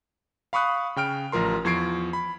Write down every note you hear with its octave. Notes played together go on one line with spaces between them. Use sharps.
F5 B5 C#6 D#6 F#6
C#3 G5 F6 D7
A1 F3 A#4 C6
E2 F3 C#6 G#6 C7 D7
B5